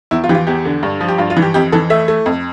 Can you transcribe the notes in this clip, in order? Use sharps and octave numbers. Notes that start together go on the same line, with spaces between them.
E2 E4
F4
E3 G4
F4
E2 G4
D3
G2
F3
G4
G2 F4
F4
E3
G4
F2 G4
E3 A4
A3 E5
A3
F2